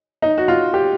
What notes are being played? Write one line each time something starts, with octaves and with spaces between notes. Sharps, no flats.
D#4
F#4
F4
G4